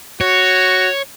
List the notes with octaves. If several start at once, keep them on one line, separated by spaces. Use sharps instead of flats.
F#4 C#5